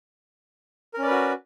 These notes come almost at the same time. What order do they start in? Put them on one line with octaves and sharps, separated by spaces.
A#4 C#4 D5 B4 F#4